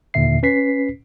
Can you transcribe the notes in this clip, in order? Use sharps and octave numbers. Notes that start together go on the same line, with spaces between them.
D#2 A#2 D3 E5 C7
C#4 B4 B6 C7